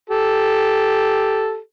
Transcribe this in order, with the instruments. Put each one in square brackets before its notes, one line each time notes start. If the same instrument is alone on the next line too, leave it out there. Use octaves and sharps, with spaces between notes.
[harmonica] G4 A4